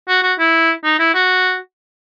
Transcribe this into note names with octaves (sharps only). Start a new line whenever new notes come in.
F#4
F#4
E4
D#4
E4
F#4